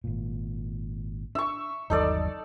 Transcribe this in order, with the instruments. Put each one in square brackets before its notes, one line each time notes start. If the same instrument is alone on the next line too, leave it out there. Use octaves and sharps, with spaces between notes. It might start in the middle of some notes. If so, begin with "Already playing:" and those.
[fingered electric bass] G#1 A#2
[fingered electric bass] D4 [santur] E5 C#6
[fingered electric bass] G1 D#2 F#3 [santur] D#4 A4 D5